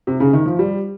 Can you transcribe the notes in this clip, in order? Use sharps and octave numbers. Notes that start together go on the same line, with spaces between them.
C3
C#3
D#3
F3
G3